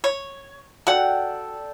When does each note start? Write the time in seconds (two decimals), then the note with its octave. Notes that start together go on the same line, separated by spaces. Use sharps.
0.04 C#5
0.87 F#4 A4 D5 F#5 G5